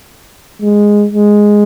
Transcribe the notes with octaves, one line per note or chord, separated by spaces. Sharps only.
G#3
G#3